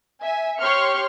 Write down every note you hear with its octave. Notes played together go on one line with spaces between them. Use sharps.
E5 G#5
G4 C#5 C6 C#6 F6 C#7